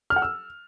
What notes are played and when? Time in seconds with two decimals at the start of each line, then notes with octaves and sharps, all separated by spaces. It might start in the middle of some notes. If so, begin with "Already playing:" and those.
0.10 F6
0.16 F#5
0.22 E6